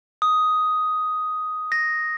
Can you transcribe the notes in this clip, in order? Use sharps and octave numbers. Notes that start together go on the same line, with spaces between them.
D#6
A#6